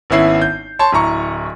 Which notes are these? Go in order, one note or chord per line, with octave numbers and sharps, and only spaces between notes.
G#1 B3 C#4 E4 E5 C7
G6
C#5 A5 C6
D1 E4 A#5 C#6